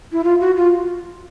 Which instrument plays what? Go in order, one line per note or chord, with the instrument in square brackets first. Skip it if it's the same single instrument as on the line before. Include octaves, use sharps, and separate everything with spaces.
[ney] E4
F4
F#4
F4